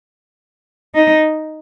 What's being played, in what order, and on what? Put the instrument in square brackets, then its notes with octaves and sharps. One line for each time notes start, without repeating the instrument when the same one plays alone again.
[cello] D#4